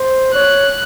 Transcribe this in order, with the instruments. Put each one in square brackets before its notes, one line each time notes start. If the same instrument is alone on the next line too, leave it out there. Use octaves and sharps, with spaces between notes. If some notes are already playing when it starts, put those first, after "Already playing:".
Already playing: [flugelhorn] C5
[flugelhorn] C#5 [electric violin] F#6